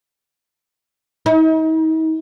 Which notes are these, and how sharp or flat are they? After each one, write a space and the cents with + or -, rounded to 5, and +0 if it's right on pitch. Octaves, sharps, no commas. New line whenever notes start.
D#4 +40